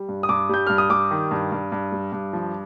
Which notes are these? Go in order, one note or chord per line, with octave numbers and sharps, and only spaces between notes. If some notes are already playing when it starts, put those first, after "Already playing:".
Already playing: G3
G2
D#6
G2 D6
G3 G6
G2 F6
D#6
G3 D6
D#3
G2
G2
G2
G3
G2
F3